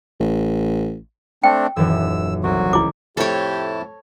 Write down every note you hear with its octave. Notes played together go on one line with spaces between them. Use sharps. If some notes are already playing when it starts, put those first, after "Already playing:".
A1
A3 C4 D4 G5
D#1 F#2 E3 E6
C2 F#3 F#4
C#2 E4 D6
F2 A2 A3 E4 G4 A4 C#5 A5